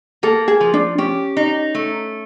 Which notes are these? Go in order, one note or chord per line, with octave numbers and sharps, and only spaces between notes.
A#3 A4
G#4
F3
D4
C#4 G4
D#4
A3